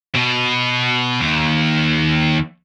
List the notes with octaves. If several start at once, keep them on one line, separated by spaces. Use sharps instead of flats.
B2
D#2